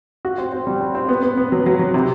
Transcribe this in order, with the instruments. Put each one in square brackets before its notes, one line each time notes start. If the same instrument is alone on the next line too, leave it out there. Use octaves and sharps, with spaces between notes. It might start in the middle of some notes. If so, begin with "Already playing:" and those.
[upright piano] F#4
C4
C4
G3
C4
C4
B3
B3
B3
F#3
F#3
F#3
C3